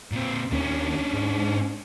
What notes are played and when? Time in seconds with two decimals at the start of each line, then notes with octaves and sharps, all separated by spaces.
0.12 A#2 C4
0.52 D#2 C#4 D4
1.13 G#2